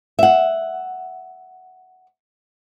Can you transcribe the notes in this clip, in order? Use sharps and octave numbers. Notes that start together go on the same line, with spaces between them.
E5 F#5